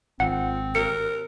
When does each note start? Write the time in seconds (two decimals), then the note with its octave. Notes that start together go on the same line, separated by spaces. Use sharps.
0.20 G#1 F3 C4 F#5
0.75 A#4 C#7